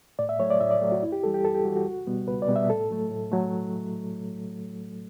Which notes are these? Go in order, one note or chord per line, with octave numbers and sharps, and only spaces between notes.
A2 D5
E5
F#3 A3 C#5
D5
A2 E5
D5
F#3 A3
F#4
F#2 E4
G4
E3 G3 A4
G4
F#2 A4
G4
E3 G3 F#4
F#4
C#2
B2 G3 B3
C#2 B4
D5
B2 G3 B3
E5
A2 A4
F#3 A3
A2
F#3 A3